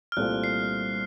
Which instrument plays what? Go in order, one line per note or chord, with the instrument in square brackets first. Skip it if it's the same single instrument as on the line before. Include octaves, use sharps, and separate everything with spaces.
[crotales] F6
[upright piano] C2 A#2 A3 C4 F4 [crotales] F#6
[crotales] C7